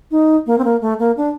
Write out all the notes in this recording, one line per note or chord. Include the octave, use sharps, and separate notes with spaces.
D#4
A#3
C4
A#3
A3
A#3
D4